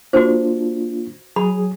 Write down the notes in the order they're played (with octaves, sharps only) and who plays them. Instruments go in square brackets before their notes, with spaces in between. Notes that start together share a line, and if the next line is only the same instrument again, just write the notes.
[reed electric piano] A#3 D4 F4 [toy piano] F#4 C5
[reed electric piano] F#3 G#4 [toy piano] B5